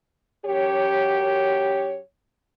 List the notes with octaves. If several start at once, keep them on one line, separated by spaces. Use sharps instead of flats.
F#2 G4 C#5